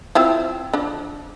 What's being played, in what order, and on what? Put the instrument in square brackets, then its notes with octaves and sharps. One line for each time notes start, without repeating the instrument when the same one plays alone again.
[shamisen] C4 E4 F4
F3 D4